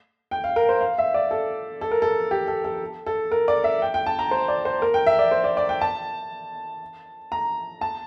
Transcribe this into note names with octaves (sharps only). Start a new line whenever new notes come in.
G5
F5
A#4
C5
F5
E5
D5
A4
A4
A#4
A4
G4
A4
A4
A4
A#4
D5
E5
G5
G5
A5
A#5
C5
D5
C5
A#4
G5
E5
D5
C5
D5
D5
G5
A5
A#5
A5